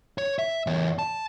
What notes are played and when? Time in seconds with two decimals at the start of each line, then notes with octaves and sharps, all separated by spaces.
0.18 C#5
0.39 E5
0.67 E2 C#5
0.99 A5